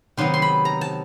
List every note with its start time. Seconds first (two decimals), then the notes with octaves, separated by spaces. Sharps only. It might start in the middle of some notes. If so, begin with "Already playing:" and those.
0.17 C3 D#3 F#3 B3 C6
0.34 C6
0.42 B5
0.65 A#5
0.81 A5